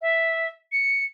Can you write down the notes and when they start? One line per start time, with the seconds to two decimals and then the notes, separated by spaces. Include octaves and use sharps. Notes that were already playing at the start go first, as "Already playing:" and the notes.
0.02 E5
0.72 C#7